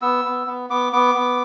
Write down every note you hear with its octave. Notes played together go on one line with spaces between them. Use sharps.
B3 E6
B3
B3
B3 D6
B3 D6
B3